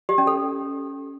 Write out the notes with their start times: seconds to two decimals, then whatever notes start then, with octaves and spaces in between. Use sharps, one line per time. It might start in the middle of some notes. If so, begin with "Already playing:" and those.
0.09 G4
0.18 C#4
0.27 A4